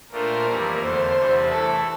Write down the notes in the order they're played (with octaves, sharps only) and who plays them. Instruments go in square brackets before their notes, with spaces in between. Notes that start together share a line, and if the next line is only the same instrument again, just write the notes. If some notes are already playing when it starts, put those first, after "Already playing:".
[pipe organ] A#2 A3 D4 F4 C5 [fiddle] A#4
[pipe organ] F2 E3 G3 A#3
[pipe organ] E2 D3 A3 [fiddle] C5
[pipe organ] E2 C3 G3 D4
[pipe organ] E3 A3 E4 [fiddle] A4